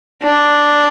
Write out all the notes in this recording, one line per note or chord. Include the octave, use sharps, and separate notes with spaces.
D4